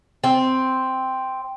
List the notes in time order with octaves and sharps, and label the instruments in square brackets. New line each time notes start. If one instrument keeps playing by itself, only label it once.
[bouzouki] C4